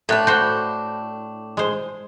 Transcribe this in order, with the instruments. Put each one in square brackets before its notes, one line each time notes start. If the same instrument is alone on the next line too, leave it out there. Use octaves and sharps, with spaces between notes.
[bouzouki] A2 D4 [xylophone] A4 E5 F#6
[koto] F#4 C5 [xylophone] F#6 G6
[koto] G#3 C5